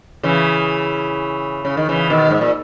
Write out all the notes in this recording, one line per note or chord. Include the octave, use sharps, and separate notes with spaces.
C#3 E3
C#3
D#3
C#3 E3
B2 D#3
G#2
A#2